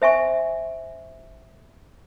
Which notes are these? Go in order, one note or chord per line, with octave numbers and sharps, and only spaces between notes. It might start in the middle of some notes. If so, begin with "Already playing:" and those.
C5 E5 G#5 C#6